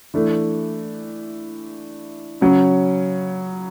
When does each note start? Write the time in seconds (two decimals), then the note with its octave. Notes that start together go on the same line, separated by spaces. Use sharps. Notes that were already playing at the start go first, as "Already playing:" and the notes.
0.14 E3 A3 D4
2.41 C#3 F#3 C#4